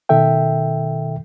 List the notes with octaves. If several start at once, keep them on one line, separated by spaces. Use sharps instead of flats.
B2 D#3 A4 E5 G5